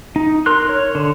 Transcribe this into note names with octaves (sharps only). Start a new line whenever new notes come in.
D#4
A#4 C6 F#6
C#5
D3